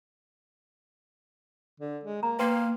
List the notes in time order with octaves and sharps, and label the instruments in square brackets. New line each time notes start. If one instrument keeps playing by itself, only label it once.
[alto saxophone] D3
G#3
[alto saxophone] A#3 [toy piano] A#5
[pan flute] A#3 [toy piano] B4 G5 C6 [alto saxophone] F5